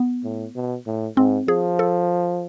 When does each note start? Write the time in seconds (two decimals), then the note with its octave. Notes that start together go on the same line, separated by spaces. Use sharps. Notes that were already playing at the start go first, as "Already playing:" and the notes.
Already playing: B3
0.24 A2
0.55 B2
0.87 A2
1.17 G#2 C4
1.48 F3 G#4
1.79 A4